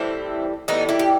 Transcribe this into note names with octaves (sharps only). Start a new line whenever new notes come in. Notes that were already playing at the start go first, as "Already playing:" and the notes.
Already playing: A2 E3 G3 C4 E4
A2 E3 G3 B3 D#4
E4 G4
G4